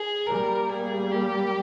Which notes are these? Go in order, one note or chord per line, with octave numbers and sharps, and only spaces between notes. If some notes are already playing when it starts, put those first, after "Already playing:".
Already playing: G#4
G3 A#3 A#4
G#4
G4